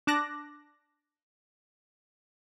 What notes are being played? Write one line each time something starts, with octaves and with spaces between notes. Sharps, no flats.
D4 A5 D6 F#6 A#6